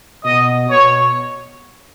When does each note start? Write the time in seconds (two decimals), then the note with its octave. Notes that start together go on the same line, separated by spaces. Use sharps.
0.24 B2 D#5
0.70 B2 C#5